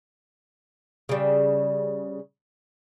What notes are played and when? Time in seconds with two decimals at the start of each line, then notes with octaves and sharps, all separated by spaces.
1.09 C#3 G3